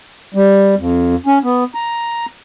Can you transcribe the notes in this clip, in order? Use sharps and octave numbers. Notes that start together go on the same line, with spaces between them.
G3
F2
C#4
B3
A#5